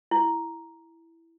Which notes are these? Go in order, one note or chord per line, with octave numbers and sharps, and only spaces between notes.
E4